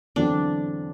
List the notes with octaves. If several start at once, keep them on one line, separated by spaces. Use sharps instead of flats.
E2 D3 F#3 C4 D4